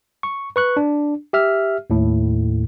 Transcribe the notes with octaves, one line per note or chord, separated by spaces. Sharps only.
C#6
B4 C#6 F#6
D4
G4 E5 F6
D#2 A2